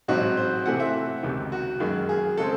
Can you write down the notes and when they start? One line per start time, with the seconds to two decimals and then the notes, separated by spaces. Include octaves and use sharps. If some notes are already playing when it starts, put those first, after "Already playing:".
0.08 A1 G#2 F#3 C4 D#4 F#4
0.37 C5
0.66 C3 E3 A3 C4 F#5
0.80 E5
1.23 C#2 C3 D#3
1.52 F#4
1.80 F#2 D#3 G#3
2.09 G#4
2.37 C#3 G#3 C4 A4